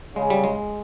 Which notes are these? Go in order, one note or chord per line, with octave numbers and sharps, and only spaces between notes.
C#3 G#3
G3
G#3